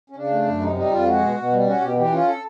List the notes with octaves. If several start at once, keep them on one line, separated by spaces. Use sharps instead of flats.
C#4
C#3 D4
A3
F#2
C3 D#4
G3 D#4
F2 F4
G#3 F#4
B2
B2
G3
C#4 F#4
B2 G4
E3 G4
C#4 F4
A4